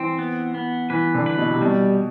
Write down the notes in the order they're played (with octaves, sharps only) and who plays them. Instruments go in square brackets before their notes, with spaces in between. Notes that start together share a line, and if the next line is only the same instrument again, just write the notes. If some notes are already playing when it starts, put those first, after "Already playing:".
Already playing: [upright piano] E3 [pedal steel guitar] C4
[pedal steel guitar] B3
B3
[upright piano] E3 [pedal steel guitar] B4
[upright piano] D3
[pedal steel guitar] B4
[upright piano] B2
C3
[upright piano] B2 [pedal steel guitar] G3